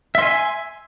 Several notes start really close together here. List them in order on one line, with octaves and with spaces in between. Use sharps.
E5 C6 G#5